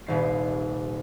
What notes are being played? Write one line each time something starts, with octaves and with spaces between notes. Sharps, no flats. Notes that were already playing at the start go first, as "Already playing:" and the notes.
D#1 C2 C7